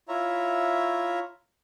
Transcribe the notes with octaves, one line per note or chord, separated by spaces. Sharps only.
E4 F4 C#5 E5 A#5